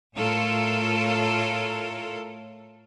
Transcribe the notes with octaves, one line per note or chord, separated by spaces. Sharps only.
A2 A3 F4 A4 A#4 C#5